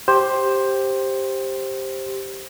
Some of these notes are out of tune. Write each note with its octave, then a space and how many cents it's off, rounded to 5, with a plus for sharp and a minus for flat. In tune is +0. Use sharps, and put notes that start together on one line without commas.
G4 +0 C5 +10